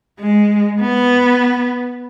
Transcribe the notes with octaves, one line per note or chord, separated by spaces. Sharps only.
G#3
B3